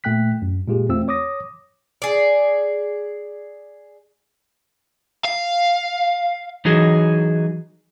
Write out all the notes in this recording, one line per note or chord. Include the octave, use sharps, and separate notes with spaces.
A#2 A3 G5 F#6 B6
F#2
A#2 G#3 F4 G4 G#4
E2 A3 C4 F4 E6
C#5 D6 D#6 A#6
G#4 D5
F5
E3 F#3 D#4 F#4 G#4 D#5